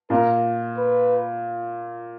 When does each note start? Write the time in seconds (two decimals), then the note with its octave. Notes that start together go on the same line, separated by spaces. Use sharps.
0.10 A#2 A#4
0.77 B4